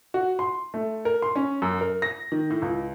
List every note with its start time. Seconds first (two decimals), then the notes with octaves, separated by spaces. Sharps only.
0.14 F#4
0.39 C6
0.74 A3
1.05 A#4
1.22 C6
1.36 C#4
1.62 F#2
1.81 A#4
2.02 A#6
2.32 D#3
2.50 A2
2.62 C#2